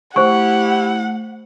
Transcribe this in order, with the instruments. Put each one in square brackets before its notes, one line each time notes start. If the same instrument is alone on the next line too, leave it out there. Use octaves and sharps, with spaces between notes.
[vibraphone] A3 [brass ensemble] E4 G4 [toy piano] C5 C#6 [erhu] F#5